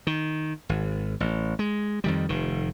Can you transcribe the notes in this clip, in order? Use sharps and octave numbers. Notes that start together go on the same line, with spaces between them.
D#3
G#1
A1
G#3
F2 D#3 G3
F1 D#3